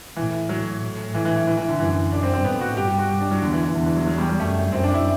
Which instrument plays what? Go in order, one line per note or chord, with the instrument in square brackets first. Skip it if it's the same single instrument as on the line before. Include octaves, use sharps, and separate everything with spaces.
[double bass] A2 [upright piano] E3
[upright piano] F#3
[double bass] A2
[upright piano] E3
E3
E3
E3
E3
D3
[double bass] F#2 [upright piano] E3
[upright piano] D4
C4
C4
[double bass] A2 [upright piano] B3
[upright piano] F#4
[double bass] G2 [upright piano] G4
[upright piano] G4
F#4
G4
D4
F#3
[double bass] E2 [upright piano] D3
[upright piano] E3
E3
[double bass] E2 [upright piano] D3
[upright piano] E3
F#3
F#3
G3
G3
[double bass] F#2 [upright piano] A3
[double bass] F#2 [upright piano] C4
[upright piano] D4
E4